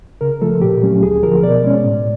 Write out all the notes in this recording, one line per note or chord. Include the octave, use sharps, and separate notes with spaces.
C#3 A#4
F3 A3 A4
A#2 G4
F#3 A3 C#4
D2 G#4
D3 F3 A#4
B2 D5
G#3 C#4
A2